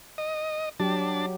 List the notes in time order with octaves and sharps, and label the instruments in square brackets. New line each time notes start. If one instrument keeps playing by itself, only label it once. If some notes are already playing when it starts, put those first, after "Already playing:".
[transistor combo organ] D#5
[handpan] F#3 G4 [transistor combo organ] D4 A5